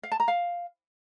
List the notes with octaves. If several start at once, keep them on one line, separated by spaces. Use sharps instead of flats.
F5
A5
A#5
F5